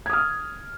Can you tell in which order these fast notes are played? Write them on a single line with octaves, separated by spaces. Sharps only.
G#6 D#6 F6